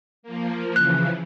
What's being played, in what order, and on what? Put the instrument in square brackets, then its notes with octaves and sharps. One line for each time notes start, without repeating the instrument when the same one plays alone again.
[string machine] F3 A#3
[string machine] C#3 E3 F3 [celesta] F#6